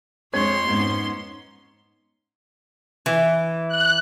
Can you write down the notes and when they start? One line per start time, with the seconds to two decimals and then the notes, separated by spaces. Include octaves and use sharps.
0.34 F2 G#3 C4 C#5 C6 G#6
0.67 G#2 B3 C#4
3.06 E3
3.68 F#6